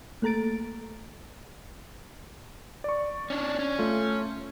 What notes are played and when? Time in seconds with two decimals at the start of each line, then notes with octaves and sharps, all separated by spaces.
0.22 A3 A#3 A4 A#5 A6 D7
2.84 D5 C#6
3.30 C#4 D4
3.59 C#4
3.79 A3 F4